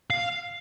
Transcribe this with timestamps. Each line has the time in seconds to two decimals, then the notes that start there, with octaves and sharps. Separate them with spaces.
0.10 F5